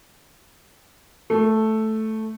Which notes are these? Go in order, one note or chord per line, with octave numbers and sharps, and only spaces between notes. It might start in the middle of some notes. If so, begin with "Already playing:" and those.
A3